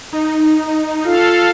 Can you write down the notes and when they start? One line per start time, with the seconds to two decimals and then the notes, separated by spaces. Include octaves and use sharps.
0.13 D#4
1.05 F4 A4 F5